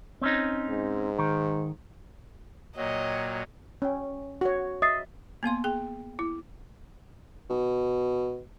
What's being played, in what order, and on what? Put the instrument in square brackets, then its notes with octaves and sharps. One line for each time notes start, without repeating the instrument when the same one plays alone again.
[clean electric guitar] C4 C#4 D#4
[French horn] G#2
[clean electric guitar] D#3
[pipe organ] A#2 F#3 [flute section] C#5 G5 [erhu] D#5
[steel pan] C#4 G5
F#4 C#5
[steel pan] D#5 E5 [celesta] D#6 A6 C7
[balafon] A#3 B3 F5 C6
G#4 G5
E4
[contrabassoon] B2